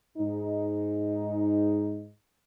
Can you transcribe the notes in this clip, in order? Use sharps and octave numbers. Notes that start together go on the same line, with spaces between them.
G#2 D#4